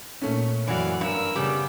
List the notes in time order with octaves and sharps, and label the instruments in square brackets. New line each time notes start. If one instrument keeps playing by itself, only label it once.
[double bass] A#2 [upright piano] A3 C#4
[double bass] F#2 [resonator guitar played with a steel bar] E3 F#4 [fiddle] D5 F5
[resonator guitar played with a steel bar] G2 [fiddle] A#4 E6
[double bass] C#3 [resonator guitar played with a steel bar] G3 B3